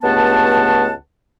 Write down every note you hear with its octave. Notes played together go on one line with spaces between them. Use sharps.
C#2 G2 A3 B3 F#5 A5